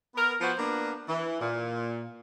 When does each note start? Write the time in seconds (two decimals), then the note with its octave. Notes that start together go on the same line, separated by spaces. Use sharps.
0.15 B3 A#4
0.41 F3 B3 F#4 C5
0.59 A#3 B3 D4
1.09 E3
1.41 A#2